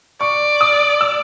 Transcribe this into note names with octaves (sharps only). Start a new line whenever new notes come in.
D5 C#6
D#6
E6